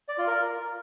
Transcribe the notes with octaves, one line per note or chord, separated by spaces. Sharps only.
D5
F4
A#4